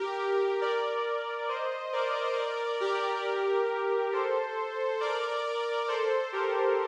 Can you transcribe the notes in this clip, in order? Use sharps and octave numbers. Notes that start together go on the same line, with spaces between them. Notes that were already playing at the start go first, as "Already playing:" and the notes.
Already playing: G4 A#4
A#4 D5
C5 D#5
A#4 D5
G4 A#4
A4 C5
A#4 D5
A4 C5
G4 A#4